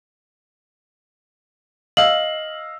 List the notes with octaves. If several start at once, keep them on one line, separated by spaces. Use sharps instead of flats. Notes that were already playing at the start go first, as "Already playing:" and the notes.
D#5 F5 E6 F#7